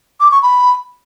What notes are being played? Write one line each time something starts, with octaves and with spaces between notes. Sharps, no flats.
D6
C#6
B5